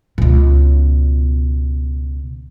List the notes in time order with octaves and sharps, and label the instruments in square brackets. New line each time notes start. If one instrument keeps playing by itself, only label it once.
[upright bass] C#2 B2